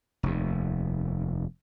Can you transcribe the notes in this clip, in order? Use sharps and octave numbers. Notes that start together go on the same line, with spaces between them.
F1 D#2